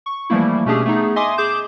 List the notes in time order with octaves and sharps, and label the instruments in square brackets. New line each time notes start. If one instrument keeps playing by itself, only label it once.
[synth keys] C#6
E3 F3 G3 A3 A#3 E4
B2 A3 C#4 D4 G4 G#4
A3 B3 D#4 G#4
D#5 E5 G#5 C6 D6 D#6
G#4 D6 G6 E7